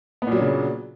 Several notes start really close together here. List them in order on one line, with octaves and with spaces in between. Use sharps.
B3 A#2 F#3 D4 C#3